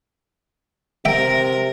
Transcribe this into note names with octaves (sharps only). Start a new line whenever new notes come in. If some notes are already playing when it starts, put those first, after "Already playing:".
C3 A#4 E5 G5